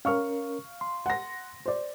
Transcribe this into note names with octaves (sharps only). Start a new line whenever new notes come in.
C#4 A#4 F5 C#6 F6
C6
F#5 A#6
C5 D5